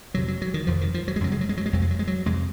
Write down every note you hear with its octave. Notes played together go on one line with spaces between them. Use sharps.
F2 C3 F#3
F#3
F#3
D#3
F2 C3 F3
D#3
F3
F#3
G#3
F#2 C#3 F#3
G#3
F#3
G#3
F#3
G#3
F2 C3 F#3
G#3
F#3
G#3
F#3
F2 C3 G#3